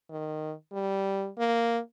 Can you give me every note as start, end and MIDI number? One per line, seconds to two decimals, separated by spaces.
0.10 0.53 51
0.72 1.29 55
1.38 1.79 58